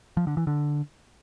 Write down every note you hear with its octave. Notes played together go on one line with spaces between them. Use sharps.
F3
D3
E3
D3